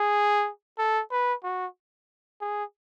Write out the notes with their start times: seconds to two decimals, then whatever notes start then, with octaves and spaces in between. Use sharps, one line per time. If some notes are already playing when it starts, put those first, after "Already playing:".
Already playing: G#4
0.78 A4
1.11 B4
1.44 F#4
2.41 G#4